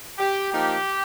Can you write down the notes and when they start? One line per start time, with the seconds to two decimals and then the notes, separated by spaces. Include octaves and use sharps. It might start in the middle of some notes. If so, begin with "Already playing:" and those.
0.19 G4
0.52 F3 A#3 D#4 G4